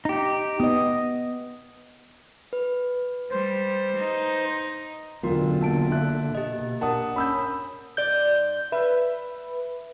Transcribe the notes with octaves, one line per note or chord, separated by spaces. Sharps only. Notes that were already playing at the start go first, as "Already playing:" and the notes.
D#4 G4
B3 D#5 D#6
B4
G3 C5
D#4
E1 F#2 D3 F4 F#4 A#4
A#3 A5 D7
E5 F#6
B2 A#3 G4 D#5
D4 A#4 F#5 A5 D#6
C#4 B5 E6 G6
G#2 D5 G6
B4 E5